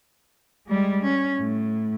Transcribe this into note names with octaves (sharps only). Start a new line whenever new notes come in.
G3 G#3
C#4
A2